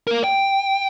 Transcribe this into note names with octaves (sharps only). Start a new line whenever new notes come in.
A#4 F5
G5